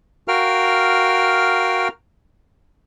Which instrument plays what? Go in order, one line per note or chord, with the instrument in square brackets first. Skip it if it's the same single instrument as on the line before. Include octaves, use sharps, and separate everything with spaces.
[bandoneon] F#4 A#4 F5 G5 F6